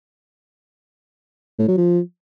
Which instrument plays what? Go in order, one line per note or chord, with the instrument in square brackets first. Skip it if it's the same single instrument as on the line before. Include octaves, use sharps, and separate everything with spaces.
[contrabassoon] A2
F#3
F3